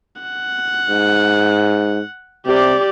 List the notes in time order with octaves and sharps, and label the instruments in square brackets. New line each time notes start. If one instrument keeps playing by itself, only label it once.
[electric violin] F#5
[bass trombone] G#2
[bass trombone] C3 [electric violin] G4 D5